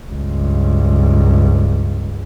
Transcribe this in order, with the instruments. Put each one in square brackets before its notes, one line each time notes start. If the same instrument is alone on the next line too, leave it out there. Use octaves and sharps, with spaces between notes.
[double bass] C#2 G2